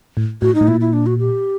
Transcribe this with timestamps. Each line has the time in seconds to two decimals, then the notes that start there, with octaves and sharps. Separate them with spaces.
0.17 A2
0.42 A2 F#4
0.55 D#4
0.61 A2
0.68 A#2 E4
0.80 E4
0.93 D4
1.06 F#4
1.19 G4